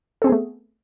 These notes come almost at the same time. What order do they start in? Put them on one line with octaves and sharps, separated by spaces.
A4 C4 G#4 B3 A3